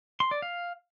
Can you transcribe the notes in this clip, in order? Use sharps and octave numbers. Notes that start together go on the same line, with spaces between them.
C6
D5
F5